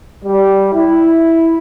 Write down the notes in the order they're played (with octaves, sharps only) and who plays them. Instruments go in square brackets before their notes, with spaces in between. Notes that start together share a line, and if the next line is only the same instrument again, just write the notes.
[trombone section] G3
E4